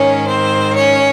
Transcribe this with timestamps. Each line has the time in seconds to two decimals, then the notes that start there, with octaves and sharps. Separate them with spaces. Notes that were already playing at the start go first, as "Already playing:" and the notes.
Already playing: G#2 D#3 C#4 C#5
0.26 C4 C5
0.76 C#4 C#5